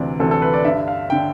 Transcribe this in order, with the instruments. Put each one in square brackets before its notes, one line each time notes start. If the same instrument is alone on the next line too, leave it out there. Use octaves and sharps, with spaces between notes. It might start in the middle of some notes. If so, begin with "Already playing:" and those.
Already playing: [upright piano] D2 C3 E3 D5
D2 C3 E3 A4
A4
B4
D5
G2 D3 E5
F5
D3 G5